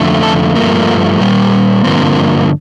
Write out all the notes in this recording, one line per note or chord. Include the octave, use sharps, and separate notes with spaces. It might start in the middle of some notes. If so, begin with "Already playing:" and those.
Already playing: F2 D3 A3
A4
G2 F3 A3 A#3
A#2 G3 A#3
G2 D3 F3 A#3 C4